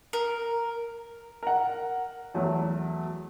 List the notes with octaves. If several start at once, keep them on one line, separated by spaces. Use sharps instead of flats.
A#4
A#4 F#5
E2 F#3 A3